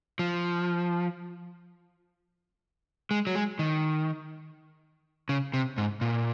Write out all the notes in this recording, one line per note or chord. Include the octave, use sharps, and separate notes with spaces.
F3
G#3
F#3
G#3
D#3
C#3
C3
G#2
A#2